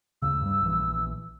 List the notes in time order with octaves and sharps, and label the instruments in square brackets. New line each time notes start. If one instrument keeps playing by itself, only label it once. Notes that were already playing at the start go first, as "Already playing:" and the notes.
[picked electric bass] D2 C#3 [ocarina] E6
[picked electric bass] G2 F#3 G3
A#1 E3